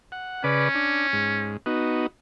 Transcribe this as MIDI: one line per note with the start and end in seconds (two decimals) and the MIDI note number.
0.12 0.43 78
0.44 0.69 49
0.44 1.57 61
0.44 0.69 71
0.44 0.69 74
0.75 1.07 62
1.13 1.57 44
1.66 2.07 59
1.66 2.07 63
1.66 2.07 66